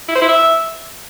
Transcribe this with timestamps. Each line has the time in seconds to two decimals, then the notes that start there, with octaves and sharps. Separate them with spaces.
0.09 E4
0.15 C5
0.22 E4
0.29 E5